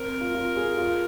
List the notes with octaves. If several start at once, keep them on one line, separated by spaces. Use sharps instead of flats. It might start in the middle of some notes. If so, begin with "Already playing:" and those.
Already playing: C4 A#4
F4
F4
G#4
F4